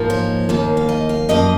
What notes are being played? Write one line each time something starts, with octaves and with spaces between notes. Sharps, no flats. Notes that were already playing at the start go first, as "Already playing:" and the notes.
Already playing: G#2 F3 A#3
C#5
D#2 D#3 A#3
F5
D#5
F5
F#2 F3 A#3 D#5